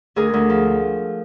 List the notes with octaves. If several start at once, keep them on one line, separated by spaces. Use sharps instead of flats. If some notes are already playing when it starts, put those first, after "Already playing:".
D2 G#4 A#4
D2
F3